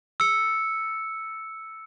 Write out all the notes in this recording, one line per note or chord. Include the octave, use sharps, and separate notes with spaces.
E6 C#7